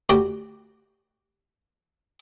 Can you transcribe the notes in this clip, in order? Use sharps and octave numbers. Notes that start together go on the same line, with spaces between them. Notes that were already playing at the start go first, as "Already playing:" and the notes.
D2 F#4 G4 D5